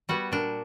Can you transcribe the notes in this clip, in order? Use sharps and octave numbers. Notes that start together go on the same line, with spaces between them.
G3 B3 F#4
A#2 D4